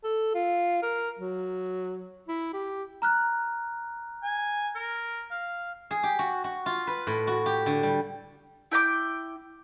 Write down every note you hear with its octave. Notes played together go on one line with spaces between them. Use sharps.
A4
F4
A#4
F#3
E4
G4
A#5 F6 F#6
G#5
A#4
F5
G#4
G4
F#4
F#4
F4
B4
A2
F#4
G4
D3
G3
E4 G5 A#5 D6